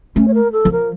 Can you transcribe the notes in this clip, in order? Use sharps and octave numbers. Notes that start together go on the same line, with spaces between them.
A3 C#4
C#5
A#4
A4
F3
A#4